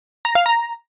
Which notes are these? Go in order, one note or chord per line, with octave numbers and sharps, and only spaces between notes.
A#5
F5
A#5